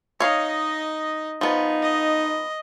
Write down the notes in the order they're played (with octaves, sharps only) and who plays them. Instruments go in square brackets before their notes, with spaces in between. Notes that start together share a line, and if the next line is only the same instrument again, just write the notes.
[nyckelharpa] D#4 D#5 [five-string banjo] C#5 F5
[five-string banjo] F3 B3 [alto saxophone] D#4
[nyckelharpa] D#5